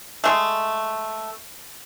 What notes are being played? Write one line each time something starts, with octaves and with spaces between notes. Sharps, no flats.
G#3 A3